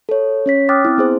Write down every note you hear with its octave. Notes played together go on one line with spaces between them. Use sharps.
A4 C#5
C#4 C#5 B6
G5 D6 D#6 F6 F#6 A6
C4 E4
B3 G#4 C5